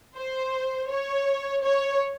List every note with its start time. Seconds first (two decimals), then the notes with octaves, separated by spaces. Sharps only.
0.16 C5
0.89 C#5
1.63 C#5